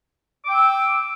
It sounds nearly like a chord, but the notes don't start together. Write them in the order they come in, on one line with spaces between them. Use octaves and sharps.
D6 G5 E6